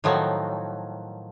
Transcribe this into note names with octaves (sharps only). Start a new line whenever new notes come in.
A2 D#3 F3 F#3